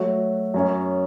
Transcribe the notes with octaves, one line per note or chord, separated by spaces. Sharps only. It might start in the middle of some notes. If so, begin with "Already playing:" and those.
Already playing: F#3 A3 F#4 C#5
F#2 F#3 C#4